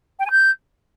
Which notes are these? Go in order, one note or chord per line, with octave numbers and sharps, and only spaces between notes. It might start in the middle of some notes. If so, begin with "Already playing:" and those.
G5
G#5
G6